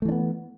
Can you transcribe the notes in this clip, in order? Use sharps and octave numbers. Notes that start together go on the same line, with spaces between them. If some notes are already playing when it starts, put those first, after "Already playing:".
E3 A3 B3 D4